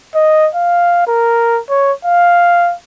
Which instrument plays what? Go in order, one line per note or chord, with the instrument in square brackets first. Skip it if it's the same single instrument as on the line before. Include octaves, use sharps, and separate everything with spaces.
[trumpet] D#5
F5
A#4
C#5
F5